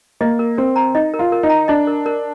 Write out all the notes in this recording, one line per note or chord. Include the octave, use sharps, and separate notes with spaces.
A#3 D#5
A#4
C4 A#4
A#5
D#4 D#5
A#4
F4
A#4
D#4
A#5
D4 D#5
A#4
A#4